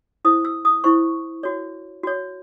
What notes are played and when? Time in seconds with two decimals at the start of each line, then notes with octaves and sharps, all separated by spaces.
0.25 E4 C5 D#6
0.45 E6
0.65 D#6
0.84 E4 C5 C#6
1.43 F#4 C#5
2.03 F#4 C#5